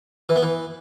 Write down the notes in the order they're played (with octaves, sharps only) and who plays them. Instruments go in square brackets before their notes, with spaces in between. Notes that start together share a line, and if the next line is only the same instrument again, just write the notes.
[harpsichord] E3
B3
E3